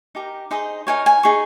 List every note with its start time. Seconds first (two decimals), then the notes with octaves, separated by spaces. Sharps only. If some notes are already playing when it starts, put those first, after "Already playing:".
0.15 D#4 G4 A#4 A#5
0.51 D#4 G#4 C5 D#5
0.87 D#4 A#4 C#5 G#5
1.06 G#5
1.23 D#4 G#4 C#6